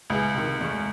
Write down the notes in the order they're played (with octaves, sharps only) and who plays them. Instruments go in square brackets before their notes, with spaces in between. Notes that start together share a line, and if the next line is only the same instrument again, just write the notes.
[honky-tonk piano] C#2 [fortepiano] B3 E4 G#4
[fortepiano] C3 D#3
E2 G#3 A3